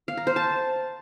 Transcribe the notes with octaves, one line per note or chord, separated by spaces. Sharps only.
F5
A#5
C5
A5